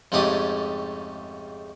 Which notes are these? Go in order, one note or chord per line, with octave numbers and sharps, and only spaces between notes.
F2 G#2 C#3 A3 G4 D#6